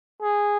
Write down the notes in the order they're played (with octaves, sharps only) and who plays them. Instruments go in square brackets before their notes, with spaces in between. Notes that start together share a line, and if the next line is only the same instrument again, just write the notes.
[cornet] G#4